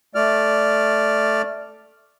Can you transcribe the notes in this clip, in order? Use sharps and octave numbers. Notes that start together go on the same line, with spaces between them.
A3 D5 F6